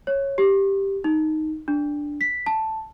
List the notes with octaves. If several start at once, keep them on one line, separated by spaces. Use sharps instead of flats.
C#5
G4
D#4
D4
B6
A5